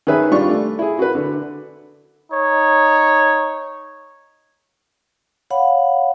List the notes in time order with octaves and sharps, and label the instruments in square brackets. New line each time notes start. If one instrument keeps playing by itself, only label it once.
[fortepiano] D#3 C#4 G#4 B4 E5
G3 D4 F4 C#6
A3
E4 G#4
F#4 B4
D3
[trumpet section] D#4 C#5
[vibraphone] C#5 F5 F#5 B5